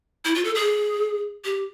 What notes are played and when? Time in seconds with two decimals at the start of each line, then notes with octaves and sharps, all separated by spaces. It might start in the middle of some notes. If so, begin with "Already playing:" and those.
0.25 E4
0.35 F4
0.44 A4
0.55 G#4
1.45 G4